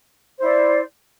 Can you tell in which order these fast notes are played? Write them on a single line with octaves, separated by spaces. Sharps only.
C5 E4 D5